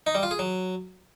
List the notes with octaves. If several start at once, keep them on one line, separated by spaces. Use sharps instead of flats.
D#4
G3
F4
G#4
F#3